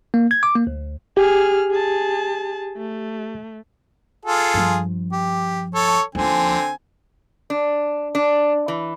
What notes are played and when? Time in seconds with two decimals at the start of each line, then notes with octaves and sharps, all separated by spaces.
0.14 A#3
0.31 G#6
0.43 D6
0.55 A#3
0.67 D2
1.17 G4 G#4 F6
1.71 G#4 A5
2.78 A3
4.25 F4 G#4 A4
4.54 G2 F3
5.13 G4
5.75 A4 C#5
6.15 D#2 D3 F3 C4 G#5
7.50 D4
8.15 D4
8.68 E3